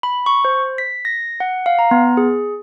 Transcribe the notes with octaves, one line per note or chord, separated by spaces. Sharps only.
B5
C#6
C5
B6
A#6
F#5
F5
A#5
B3
G#4